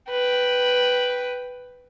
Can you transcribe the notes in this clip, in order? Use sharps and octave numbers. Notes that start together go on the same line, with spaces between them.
B4 G5